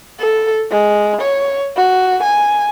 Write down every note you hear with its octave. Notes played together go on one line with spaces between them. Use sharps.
A4
G#3
C#5
F#4
G#5